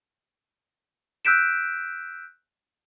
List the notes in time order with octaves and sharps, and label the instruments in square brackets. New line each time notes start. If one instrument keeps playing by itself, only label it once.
[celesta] E6 F#6 G6 B6 D7 E7